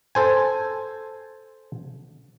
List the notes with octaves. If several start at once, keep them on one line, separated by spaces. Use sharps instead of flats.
A4 C5 G#5